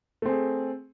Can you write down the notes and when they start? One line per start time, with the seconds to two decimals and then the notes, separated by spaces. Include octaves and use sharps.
0.22 A3
0.26 C4
0.29 G#4